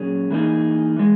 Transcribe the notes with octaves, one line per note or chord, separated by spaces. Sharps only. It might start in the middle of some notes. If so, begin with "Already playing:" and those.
Already playing: A#2 F#3 C#4 G#4
E3 A#3 D#4 G#4
E3 G#3